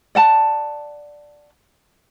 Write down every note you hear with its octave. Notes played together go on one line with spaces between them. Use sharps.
D5 F#5 A5